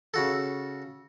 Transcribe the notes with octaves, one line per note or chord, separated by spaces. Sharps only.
C#3 F#4 A4